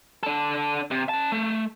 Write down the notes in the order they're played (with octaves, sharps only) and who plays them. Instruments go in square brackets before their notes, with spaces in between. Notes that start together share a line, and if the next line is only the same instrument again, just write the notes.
[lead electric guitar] D4 A4
C3
C#4 A5
A3